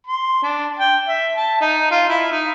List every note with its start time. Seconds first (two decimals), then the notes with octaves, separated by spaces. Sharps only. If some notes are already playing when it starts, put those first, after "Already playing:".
0.07 C6
0.43 D4
0.79 G5
1.08 E5
1.37 A5
1.61 D#4
1.91 F4
2.09 E4
2.32 D#4